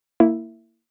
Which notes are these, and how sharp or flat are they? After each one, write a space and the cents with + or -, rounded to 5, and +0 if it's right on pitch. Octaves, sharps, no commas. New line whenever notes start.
A#3 -20 E4 +0